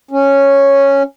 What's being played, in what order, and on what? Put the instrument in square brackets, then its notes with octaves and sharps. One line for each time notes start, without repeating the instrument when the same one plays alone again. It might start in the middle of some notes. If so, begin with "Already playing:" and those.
[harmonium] C#4